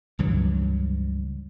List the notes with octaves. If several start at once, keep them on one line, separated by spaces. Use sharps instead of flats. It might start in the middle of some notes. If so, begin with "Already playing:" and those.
C#2 G2 E3 F#3